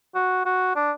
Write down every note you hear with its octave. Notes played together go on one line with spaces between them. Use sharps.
F#4
F#4
D4